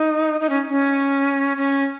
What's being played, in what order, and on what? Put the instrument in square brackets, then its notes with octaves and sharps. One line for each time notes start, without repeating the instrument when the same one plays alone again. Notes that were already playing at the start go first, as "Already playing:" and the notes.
Already playing: [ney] D#4
D#4
C#4
C#4
C#4